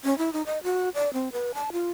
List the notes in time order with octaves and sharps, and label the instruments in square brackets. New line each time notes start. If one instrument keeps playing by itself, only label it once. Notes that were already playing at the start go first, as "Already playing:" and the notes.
[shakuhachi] C#4
E4
D#4
D#5
F#4
D5
C4
B4
A5
F4